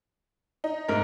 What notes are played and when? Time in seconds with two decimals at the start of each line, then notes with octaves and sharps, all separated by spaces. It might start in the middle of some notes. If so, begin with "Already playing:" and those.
0.64 D#4
0.88 G#2 A#4